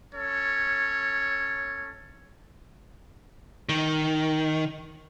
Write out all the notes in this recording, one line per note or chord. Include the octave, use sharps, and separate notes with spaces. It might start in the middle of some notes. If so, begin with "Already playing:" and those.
C#4 A4 C#5
D#3